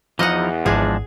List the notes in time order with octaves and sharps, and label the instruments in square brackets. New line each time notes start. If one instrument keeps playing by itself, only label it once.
[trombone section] E2 [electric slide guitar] E3 F3 D#4 [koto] D#5 F#5
[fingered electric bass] D#1 G#1 [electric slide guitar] F3 G#3 D4 [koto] G#4